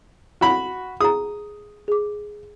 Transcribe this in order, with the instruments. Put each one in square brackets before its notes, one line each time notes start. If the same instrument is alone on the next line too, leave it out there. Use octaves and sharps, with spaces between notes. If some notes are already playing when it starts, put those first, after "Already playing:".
[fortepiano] F#4 B5
[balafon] G#4 A#5 [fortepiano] D#6
[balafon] G#4 D6